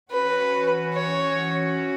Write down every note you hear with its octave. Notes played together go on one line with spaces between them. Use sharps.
E3 C#4 F#4 B4
C#5